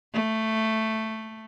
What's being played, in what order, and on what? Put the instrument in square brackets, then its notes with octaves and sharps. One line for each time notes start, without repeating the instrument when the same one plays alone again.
[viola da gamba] A3